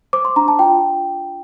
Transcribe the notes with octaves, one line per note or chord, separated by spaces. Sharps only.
C5 D6
C6
D4 A#5
A5
F4 G5